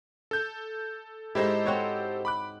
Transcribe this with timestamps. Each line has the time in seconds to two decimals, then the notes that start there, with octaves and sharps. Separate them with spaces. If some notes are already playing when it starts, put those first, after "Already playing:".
0.31 A4 G6
1.35 G#2 D#4 E4 G4 A4 C5
1.65 C4 F#4 C#5
2.25 B5 D6 F#6